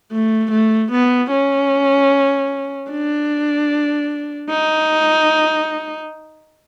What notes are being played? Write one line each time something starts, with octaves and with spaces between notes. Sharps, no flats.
A3
A3
B3
C#4
D4
D#4